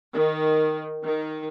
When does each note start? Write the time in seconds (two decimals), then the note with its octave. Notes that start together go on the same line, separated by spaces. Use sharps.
0.14 D#3
1.04 D#3